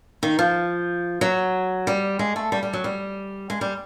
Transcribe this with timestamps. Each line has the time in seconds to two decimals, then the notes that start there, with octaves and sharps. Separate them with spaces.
0.23 D#3
0.39 F3
1.21 F#3
1.87 G3
2.19 G#3
2.36 A3
2.52 G3
2.63 G3
2.73 F#3
2.84 G3
3.50 G#3
3.61 G3